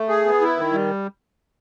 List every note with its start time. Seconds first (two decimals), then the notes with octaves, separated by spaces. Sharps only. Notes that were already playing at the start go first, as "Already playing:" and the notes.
Already playing: A3
0.09 G#4
0.26 B3
0.41 E4
0.57 D#3
0.73 G3